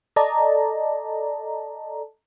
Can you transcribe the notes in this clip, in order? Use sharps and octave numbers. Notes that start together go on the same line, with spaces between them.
A4 D5 D#5 A5 A#5